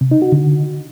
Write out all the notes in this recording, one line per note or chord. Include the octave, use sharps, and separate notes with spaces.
C3
D#4
F#4
D3